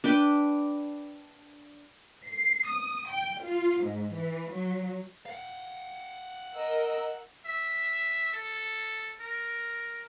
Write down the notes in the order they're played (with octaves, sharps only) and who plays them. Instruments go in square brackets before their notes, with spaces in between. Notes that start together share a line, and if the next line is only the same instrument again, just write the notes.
[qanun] D4 B4 G5
[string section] C7
D#6
G5
F4
G#2
E3
F#3
[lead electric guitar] F5 F#5
[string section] A#4 D#5 E6
[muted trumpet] E5
A4
A#4